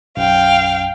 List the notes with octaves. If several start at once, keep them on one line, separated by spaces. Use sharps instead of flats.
B1 F#2 F5 G5